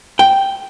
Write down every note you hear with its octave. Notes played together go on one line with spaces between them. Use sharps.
G5